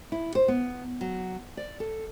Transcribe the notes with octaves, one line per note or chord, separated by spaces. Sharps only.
E4
C5
B3
F#3
D5
A4